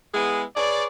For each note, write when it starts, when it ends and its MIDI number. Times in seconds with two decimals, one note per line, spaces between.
0.14 0.43 56
0.14 0.43 59
0.14 0.43 64
0.14 0.43 68
0.14 0.43 78
0.14 0.43 80
0.56 0.86 68
0.56 0.86 71
0.56 0.86 73
0.56 0.86 74